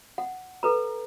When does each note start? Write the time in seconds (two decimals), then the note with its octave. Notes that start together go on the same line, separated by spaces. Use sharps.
0.18 F#5
0.63 A4 B4 A#5